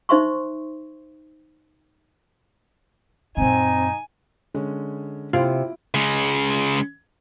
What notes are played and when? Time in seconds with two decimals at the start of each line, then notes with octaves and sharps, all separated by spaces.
0.09 D#4 C5 E5 C6 C#6
3.37 F#2 A#2 C4 D#4 G#5
4.54 D3 G#3 C#4
5.33 C3 E4 F4 D7
5.94 C#3 G#3